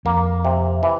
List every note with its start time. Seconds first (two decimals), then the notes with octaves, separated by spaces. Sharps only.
0.05 F2 A#3
0.45 C3
0.83 E3